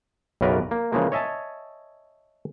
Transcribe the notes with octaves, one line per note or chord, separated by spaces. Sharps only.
B1 F#2 C#3 A#4 B4 D5
A#3
C#3 E3 F3 G#3 A#3
C#5 D#5 E5 G#5 A5